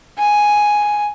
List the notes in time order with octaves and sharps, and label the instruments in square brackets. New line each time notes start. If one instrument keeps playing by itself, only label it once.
[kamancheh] G#5